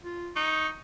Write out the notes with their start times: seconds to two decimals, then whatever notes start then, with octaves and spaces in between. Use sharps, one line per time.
0.04 F4
0.36 D#4 C#6